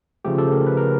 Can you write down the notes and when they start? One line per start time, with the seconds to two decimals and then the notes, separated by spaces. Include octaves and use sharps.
0.25 C#3 F3 A3 G4
0.38 A4
0.52 A#4
0.67 B4
0.77 A#4